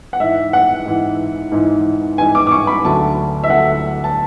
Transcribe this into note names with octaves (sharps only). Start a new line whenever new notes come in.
F#5
G#2 E3 E5
F#5
G#2 E3
G#2 E3
G#2 E3 G#5
D6
D6
C#6
B5
D2 D3 F#3 A5
E5
D2 D3 F#3 F#5
A5